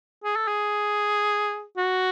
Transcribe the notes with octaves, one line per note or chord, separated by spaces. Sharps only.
G#4
A4
G#4
F#4